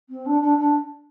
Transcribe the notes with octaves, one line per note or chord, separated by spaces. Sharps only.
C4
D4
D4
D4